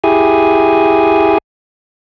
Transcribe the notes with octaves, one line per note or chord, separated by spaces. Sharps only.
E4 G4 G#4 G#5